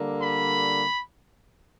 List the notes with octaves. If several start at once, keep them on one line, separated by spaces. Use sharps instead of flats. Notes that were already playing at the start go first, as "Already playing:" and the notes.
Already playing: D3 G3 A#3
B5